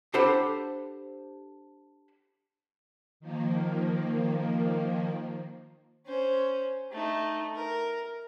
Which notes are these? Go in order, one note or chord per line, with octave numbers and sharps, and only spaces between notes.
D4 G4 A4 C5 F#5 B5
D#3 F3 A#3
C#4 C5
A3 D#4
A#4